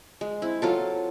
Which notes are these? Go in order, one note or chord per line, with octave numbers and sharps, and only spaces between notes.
G#3
C4 E4
F#3 F4 A4